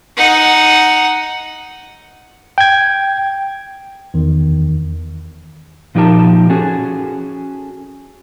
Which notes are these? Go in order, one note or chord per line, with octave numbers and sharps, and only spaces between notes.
D#4 F#5
G5 G#6
E2 D#3
A#2 F3 D#4 G4 A#4 A5
C#4 F#4 G#4 A4